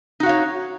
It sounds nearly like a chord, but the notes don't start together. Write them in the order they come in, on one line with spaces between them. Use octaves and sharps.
D#4 F#4 F5 C#5